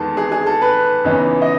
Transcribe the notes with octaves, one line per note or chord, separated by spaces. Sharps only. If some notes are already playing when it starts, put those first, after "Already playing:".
Already playing: E2 D#3 G#3 B3 A4
G#4
G#4
A4
B4
E2 C#3 E3 B3 D#4
D#5